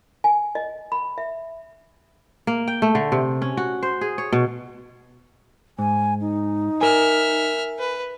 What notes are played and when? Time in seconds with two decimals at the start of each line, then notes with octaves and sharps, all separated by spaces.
0.24 G#5
0.55 D#5
0.92 B5
1.18 E5
2.47 A#3
2.68 G5
2.82 A3
2.95 D3
3.12 C3
3.42 C#4
3.57 F#4
3.83 C5
4.01 G#4
4.18 C#5
4.32 B2
5.79 G#2 G#5
6.21 D#4
6.81 A#4 E5 G#5 F6
7.79 B4